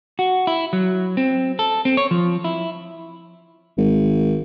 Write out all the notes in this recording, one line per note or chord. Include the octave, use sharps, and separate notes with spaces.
F#4
E4
F#3
C4
A4
C4
C#5
F3
E4
G#1